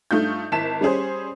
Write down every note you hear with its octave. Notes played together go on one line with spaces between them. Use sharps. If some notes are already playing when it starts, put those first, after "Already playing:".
G2 A3 D#4 F4 G6
G#1 E4 A5 B6 E7
G3 C#4 G#4 C5